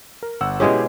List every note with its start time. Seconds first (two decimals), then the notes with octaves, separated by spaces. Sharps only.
0.23 A#4
0.41 G1 F#5 E6
0.60 B2 G#3 C#4 E4 G4 G#4